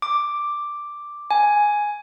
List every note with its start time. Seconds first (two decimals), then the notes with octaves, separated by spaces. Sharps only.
0.02 D6
1.31 G#5